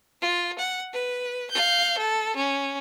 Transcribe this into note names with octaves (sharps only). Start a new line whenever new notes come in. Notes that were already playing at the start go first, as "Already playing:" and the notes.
F4
F#5
B4
F5 G6
A4
C#4